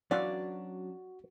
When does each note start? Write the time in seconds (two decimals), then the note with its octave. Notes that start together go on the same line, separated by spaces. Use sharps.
0.11 E3 F#3 B3 C#4 D4 F4 F#4 D5